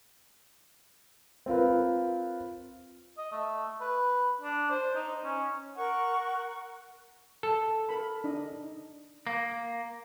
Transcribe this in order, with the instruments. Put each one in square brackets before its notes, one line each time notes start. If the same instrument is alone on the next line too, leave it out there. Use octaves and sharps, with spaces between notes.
[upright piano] C4 F4 A#4 B4
[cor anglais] D#5
A3
B4
D4
C5
D#4
C#4
[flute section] A#4 F#5 C#6
[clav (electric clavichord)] A4
[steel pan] A#4 B5
D4 D#4 D#5
[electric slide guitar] A#3